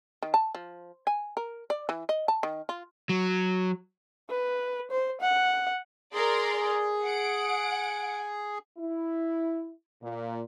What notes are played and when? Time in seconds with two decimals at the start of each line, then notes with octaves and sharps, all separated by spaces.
0.23 D#3
0.34 A5
0.55 F3
1.07 G#5
1.37 A#4
1.70 D5
1.89 E3
2.09 D#5
2.28 A5
2.43 D#3
2.69 F4
3.09 F#3
4.30 B4
4.91 C5
5.21 F#5
6.14 G#4 A#4 D5 C6
7.03 F#5 C#7 D7
8.79 E4
10.03 A#2